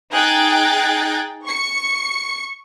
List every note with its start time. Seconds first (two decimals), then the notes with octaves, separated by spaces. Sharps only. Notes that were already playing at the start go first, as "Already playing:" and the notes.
0.12 D#4 G#4 G5 F#6 G#6 A6
1.44 C#6 C#7